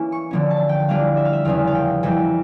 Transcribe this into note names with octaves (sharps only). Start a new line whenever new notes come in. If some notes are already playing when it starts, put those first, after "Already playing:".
Already playing: E3 A#3 C#4 E4
C#6
D3 F3 A#3 C#4
A5
G5
E3 G3 A#3 D4 F4 F5
E5
F5
E5
E2 C#3 F3 C#4 F5
F5
G5
F2 E3 G3 G5